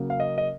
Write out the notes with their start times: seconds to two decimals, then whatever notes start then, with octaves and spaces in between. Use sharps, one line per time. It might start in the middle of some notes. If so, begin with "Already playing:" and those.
Already playing: C#3 F#3 A#3
0.10 F5
0.20 D#5
0.38 D#5